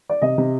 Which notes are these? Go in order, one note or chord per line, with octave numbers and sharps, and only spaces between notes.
D5
C3 D#5
C3